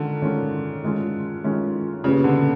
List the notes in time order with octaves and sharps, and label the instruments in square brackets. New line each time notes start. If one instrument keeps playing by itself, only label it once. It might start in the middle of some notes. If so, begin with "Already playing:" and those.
Already playing: [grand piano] D3 [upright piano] D#3 G#3 C#4 F4
[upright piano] D#3 G#3 C#4 F4
D#3 G#3 C#4 F4
D#3 G#3 C#4 F4
[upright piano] A#2 G3 B3 [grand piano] C#3
[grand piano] D3